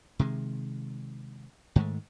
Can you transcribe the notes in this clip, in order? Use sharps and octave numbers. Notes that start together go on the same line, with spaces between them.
C3 D#3 G#3
G#2 D#3 G#3 A3